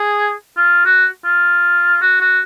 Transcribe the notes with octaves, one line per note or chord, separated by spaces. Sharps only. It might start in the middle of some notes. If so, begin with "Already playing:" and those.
Already playing: G#4
F4
F#4
F4
F#4
F#4